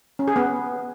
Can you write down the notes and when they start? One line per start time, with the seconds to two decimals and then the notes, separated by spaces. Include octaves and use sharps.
0.19 C#4
0.28 G#4
0.36 B3